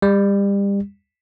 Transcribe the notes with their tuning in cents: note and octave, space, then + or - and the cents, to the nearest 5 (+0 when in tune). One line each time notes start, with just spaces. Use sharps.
G3 +30